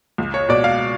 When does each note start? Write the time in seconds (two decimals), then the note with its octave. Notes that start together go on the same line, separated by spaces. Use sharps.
0.18 C#2
0.34 C#5
0.49 B2 D5
0.64 F5